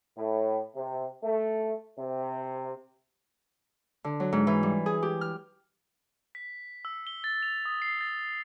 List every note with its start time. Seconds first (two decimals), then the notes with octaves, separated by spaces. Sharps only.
0.16 A2
0.75 C3
1.23 A3
1.98 C3
4.04 D3
4.20 F#3
4.32 G#2
4.47 E3
4.63 G3
4.86 G#4
5.03 G4
5.21 F6
6.35 B6
6.85 E6
7.07 G7
7.24 A6
7.43 F7
7.65 D#6
7.82 C7
8.01 A6